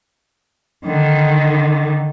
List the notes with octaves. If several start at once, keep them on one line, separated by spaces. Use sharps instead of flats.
D3 D#3